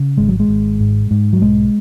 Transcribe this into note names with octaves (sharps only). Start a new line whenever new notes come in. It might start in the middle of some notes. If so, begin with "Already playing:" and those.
Already playing: C#3
G#1 G#3
F#3
G#3
G#1
G#2
G#2
F#3
B1 G#3